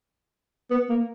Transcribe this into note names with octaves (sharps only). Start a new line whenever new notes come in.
B3
A#3